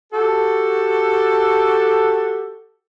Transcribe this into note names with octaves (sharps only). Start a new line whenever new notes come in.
F#4 G4 A4